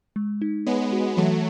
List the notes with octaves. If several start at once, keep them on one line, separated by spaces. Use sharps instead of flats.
G#3
D#4
G#3 B3 C#5
F#4
E3 F#3 A3